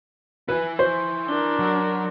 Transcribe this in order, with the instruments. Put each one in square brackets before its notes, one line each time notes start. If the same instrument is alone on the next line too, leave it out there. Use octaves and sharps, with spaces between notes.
[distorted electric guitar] E4 G#5 [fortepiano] B4
[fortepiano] C5 [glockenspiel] C6 C#6 G6
[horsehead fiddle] D4 A#4 [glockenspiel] G7
[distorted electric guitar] F#3